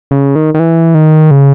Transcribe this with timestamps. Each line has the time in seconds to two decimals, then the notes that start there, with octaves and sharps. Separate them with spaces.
0.11 C#3
0.36 D#3
0.54 D#3
0.59 E3
0.94 D#3
1.31 C#3